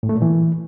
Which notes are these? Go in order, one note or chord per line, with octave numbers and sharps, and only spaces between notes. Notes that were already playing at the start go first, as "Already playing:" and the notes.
A2
A3
A#2
E3